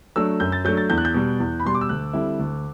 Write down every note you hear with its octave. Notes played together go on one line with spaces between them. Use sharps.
F#3 A3 D4 E6
F#2 G6
A6
F#3 A3 D4 G6
A6
E2 G6
F#6
G6
B2 G3
E2
B5
B2 G3 C6
D6
E6
D2 F#6
D3 G3 C4 E4
D2